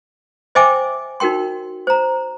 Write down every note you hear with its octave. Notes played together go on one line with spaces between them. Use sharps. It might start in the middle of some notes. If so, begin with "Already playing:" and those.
C5 D#5 E5 G5 G#5 D6
D#4 F#4 A#4 G5 C6
C5 A#5